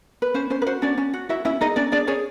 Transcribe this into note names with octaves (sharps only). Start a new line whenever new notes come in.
B4
C#4 C5
C#4 C5
B4
F#4 C5
C#4 D4 D5
C#4
F#4
E4 F#4 E5
C#4 E4 E5
D#4 G#4 D#5
C#4 D4 D5
D4 G#4 D5
C#4 G#4 C#5